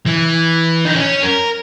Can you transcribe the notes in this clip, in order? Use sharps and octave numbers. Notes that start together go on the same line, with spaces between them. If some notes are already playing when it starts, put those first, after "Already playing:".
E3
D#4
C#4
A#4